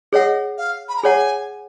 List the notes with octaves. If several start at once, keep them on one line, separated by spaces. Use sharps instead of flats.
G#4 C#5 D#5 F#5
F5
B5
A#5
G#4 C#5 F#5 G#5